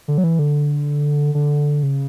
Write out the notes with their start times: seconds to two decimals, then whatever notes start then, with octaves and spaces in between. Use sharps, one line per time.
0.08 D3
0.18 F#3
0.24 E3
0.39 D3
1.35 D3
1.83 C#3